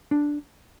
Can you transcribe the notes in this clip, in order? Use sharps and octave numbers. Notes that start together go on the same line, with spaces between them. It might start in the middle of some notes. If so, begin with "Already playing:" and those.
D4